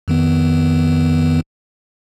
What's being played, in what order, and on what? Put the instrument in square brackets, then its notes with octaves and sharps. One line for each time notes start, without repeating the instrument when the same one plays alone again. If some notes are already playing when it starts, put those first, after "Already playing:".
[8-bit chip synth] F2 D#3 B3